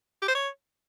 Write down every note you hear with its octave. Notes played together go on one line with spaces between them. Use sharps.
G4
C5
C#5